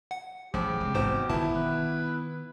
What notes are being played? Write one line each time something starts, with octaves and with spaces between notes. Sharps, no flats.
F#5
A1 C#3 F3 G4
F1 G#3 C4
A1 G#2 B2 C5 E7
G1 B2 D#3 B3 E4 A5
D#3 B4